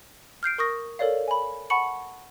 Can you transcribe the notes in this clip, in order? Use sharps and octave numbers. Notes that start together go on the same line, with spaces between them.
F6 G6 C7 D7
A#4 C#6 D#6 A#6
A4 A#4 C#5 D5 F5
G#5 B5
F#5 A5 B5 C#6 C#7 F#7